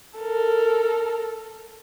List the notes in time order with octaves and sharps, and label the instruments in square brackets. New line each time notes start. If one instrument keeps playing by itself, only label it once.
[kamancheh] A4 A#4